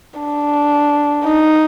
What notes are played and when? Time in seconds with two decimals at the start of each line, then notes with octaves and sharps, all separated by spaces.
0.20 D4
1.24 D#4